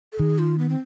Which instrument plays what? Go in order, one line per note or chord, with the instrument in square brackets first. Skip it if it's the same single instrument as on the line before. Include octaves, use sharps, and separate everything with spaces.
[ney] A4
[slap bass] D#3 [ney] G#4
[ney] F4
B3
C4